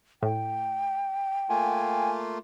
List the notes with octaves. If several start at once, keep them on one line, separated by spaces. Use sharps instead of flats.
A2 G5
A3 A#3 F4 G#5